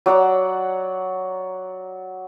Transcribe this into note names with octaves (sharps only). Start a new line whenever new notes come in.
F#3 D5 F#5 A#5